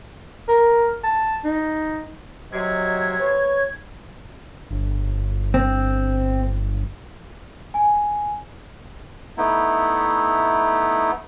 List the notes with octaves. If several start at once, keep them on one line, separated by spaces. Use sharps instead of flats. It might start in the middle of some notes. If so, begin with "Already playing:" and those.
A#4
A5
D#4
C3 F#3 D#5 G#6
B4 C#5
G1
C4
G#5
A3 B3 D#4 E4